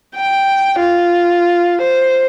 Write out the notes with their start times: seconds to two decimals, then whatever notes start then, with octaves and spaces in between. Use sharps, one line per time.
0.16 G5
0.80 F4
1.82 C5